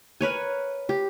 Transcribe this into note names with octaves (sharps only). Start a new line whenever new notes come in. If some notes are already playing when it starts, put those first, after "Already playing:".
A#4 B4 C#5 G#5
G4